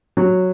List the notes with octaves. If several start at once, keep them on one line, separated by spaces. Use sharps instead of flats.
F#3